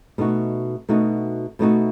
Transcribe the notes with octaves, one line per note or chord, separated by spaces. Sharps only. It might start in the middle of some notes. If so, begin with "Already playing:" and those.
B2 A3 D#4 F#4
B2 A3 D#4 F#4
B2 A3 D#4 F#4